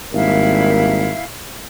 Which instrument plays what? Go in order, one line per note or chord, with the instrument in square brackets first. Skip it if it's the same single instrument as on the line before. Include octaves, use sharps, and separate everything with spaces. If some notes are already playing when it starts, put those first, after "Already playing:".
[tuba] G#1 [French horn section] G3 A#3 A#4 [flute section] E4 E5 F5